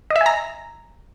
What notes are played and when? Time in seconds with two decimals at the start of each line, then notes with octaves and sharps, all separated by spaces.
0.10 D#5
0.16 E5
0.21 G#5
0.26 A#5